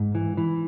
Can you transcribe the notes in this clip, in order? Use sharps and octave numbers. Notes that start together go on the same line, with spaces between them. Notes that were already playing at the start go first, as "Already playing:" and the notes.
Already playing: G#2
E3
E3